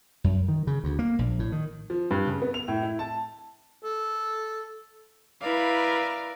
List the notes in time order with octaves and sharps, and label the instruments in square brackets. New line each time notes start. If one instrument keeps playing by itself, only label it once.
[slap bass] F#2
D#3
C#3
D2
A#3
A#1
A2
D#3
[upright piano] F3
G2
C#3
B3
F7
A2
E4
A5
[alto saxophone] A4
[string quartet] E4 A#4 B4 D5 F5